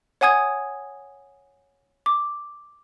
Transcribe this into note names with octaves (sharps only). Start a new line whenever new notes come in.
C#5 F#5 G#5 D#6 G#6
D6